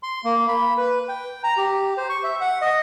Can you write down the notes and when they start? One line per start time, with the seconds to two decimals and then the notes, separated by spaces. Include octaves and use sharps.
0.03 C6
0.24 A#3
0.48 B5
0.77 B4
1.09 G5
1.44 A#5
1.57 G4
1.97 C5
2.09 C#6
2.24 E5
2.41 F#5
2.62 D#5